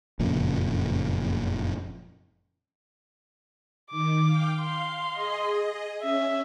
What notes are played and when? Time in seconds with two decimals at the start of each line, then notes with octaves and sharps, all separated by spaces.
0.19 F#1 F2 A#2 C#3
3.91 D#3 D6
4.26 F5 G5
4.61 F5 C6
5.12 G#4 D#5
6.02 C#4 E5